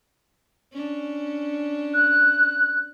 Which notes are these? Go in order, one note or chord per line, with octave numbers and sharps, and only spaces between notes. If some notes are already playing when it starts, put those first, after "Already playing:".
C#4 D4
F#6